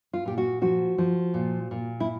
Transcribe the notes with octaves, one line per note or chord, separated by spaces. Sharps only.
F4
A#2 G4
F#4
F3 F#4
F3
A#2
A#2
E4